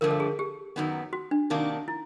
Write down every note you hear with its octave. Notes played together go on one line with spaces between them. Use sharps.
G2 D3 F3 A3 A#4
A4
G#4
G4
F#2 D#3 F#3 B3
F#4
D4
C3 D#3 F#3 A#3 D4 D#4
E4